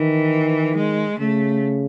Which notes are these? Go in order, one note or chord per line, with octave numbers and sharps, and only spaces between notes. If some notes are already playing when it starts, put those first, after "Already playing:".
Already playing: D#3 E3
G#3
C#3 A3